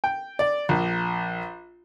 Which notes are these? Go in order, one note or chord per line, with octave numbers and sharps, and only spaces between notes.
G5
D5
A#1